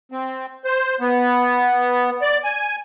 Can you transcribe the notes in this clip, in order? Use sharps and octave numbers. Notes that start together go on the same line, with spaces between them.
C4
C5
B3
D5
G#5